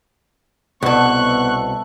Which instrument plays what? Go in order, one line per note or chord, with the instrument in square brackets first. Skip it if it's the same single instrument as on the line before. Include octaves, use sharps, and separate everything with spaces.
[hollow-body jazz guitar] C2 B2 [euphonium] B3 [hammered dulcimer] A4 E5 F#5 [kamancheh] C#6 F#6